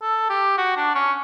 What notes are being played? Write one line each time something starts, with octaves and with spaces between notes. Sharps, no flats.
A4
G4
F#4
D4
C#4